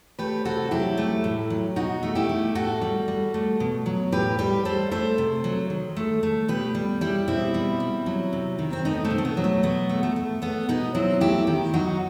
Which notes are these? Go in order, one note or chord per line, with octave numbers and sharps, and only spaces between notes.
A3 G4 B4
C3 F#4 A4
F#3 E4 G4
A3
A2
F#3
B2 D#4 F#4
A3
E4 G4
A3
A2 F#4 A4
G3
G3
A3
B2
F#3
A2 G4 B4
G3 G4 B4
G3 A4 C5
A3 A4 C5
C3
F#3
D#3
A3
A3
B2 G4 B4
G3
G3 E4 G4
B2 C4 E4
G3
G3
F#3
C3
D#3
C4
A3 B3 D#4
A3 C4
B2
A3
B3
F#3
A3
B2 B3
A3
A3
A3
A3 B3
B2 B3 D#4
F#3 C4 E4
A3 E4 G4
D#3 E4 G4
F#3 D#4 F#4